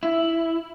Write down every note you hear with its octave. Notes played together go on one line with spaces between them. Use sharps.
E4